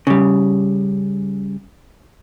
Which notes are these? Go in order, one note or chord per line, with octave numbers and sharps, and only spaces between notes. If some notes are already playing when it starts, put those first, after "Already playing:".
C#3 G3